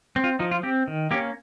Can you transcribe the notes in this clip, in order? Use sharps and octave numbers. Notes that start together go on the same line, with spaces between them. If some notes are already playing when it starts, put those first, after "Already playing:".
C4
F4
F3 D#4
F4
C4 G4
D#3
A#3 C#4 G4